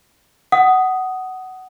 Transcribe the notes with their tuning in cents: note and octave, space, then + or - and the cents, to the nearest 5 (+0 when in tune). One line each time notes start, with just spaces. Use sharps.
F#5 +15 D#6 +0